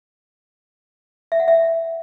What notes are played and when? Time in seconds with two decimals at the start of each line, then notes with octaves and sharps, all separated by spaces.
1.32 E5
1.40 F#5
1.48 E5